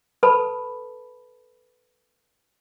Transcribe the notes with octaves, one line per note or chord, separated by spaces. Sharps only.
A4 B4 A5 B5